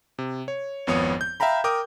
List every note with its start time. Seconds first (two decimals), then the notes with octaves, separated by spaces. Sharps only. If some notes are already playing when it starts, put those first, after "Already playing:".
0.19 C3
0.48 C#5
0.87 G#1 F2 B3 C#5 D#6
1.21 G6
1.40 E5 F5 G5 A#5 B5
1.64 A#4 G5 D6 D#6 G6